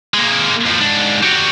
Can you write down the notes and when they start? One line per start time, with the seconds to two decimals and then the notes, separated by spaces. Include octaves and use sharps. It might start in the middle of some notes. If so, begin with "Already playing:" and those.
0.14 G#3 A#3
0.66 D#2 F3
0.80 G#2 D4
1.23 G3 F#4